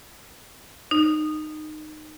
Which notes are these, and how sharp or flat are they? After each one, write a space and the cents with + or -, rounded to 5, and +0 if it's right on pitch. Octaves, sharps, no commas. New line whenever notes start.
D#4 -20